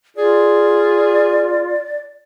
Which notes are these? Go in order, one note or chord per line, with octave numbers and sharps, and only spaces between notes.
F4 G#4 D5